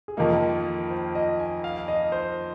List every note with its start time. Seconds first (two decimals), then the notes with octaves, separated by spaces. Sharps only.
0.08 G#4
0.17 F2 D#3 A#3 D#4 F4
0.54 A#4
0.90 C5
1.15 D#5
1.40 G#5
1.64 F5
1.77 F5
1.88 D#5
2.12 C5